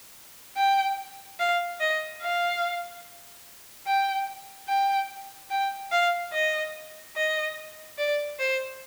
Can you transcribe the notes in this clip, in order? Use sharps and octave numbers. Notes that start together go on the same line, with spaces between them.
G5
F5
D#5
F5
G5
G5
G5
F5
D#5
D#5
D5
C5